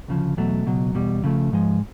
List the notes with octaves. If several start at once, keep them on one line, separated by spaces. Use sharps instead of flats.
D2 C#3 F3
E2 B2 F#3 A3
C#2 B2 F#3
E2 B2 G3
C#3 F3 A3
G#2 F3 G#3